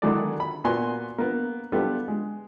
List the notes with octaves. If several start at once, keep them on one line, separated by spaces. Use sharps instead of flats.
D3 D#3 F#3 G#3 E4 D5
B5
A#2 A#3 B3 F#4 G#5 C6
A#3 B3
G3 B3 F4 G4 A4
G#3